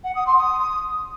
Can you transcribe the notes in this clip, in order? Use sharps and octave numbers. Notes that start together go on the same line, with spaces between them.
F#5
D#6
C6
D#6